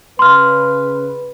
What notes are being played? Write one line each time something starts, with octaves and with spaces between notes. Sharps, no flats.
C#3 B4 C6 F6